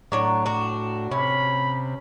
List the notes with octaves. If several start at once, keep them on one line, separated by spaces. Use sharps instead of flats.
A2 F#3 D4 C#5
D4 F#4
C3 C#4 B5